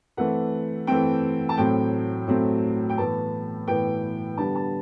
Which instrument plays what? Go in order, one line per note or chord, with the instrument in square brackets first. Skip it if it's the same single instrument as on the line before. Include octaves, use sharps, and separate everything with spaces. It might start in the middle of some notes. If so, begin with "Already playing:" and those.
[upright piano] E3 A3 C4 F#5
E3 A3 C4 G5
A5
A2 F#3 A3 C4 G5
A2 F#3 A3 C4
G5
A2 E3 B3 A5
A2 E3 B3 G5
D3 G3 B3 A5
A5